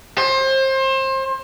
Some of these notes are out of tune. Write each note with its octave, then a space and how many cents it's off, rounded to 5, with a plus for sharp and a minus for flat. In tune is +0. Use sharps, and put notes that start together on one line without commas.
C5 +30